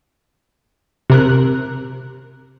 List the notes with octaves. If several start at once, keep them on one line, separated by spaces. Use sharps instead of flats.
C3 A#4 F#6